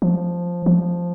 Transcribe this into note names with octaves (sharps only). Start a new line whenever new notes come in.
F3
F3